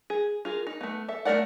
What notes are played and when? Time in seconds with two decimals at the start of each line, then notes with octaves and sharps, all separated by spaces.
0.10 G#4
0.45 F4 G#4 A#4
0.67 D#4
0.81 A3 B3
1.09 A4 E5
1.25 A3 F4 A#4 D5 F#5